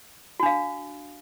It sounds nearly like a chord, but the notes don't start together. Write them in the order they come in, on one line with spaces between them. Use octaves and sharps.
F#4 D4 F5